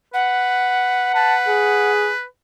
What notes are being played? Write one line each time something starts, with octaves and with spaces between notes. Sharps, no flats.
B4 F#5
B4 A5
G#4